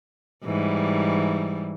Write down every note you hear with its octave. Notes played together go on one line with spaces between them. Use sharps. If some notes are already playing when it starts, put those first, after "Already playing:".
G#2 E3 G3